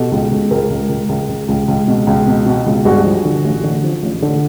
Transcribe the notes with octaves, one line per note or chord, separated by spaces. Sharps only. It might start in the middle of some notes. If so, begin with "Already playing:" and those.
Already playing: B2 G4 A4
C#2
C#2
C#2 G#4 A#4
C#2
C#2
C#2
C#2
C#2
C#2
B2
C#2
B2
B2
C#2
G2 F#4 G#4
F3
D3
A1
D3
F3
A1
D3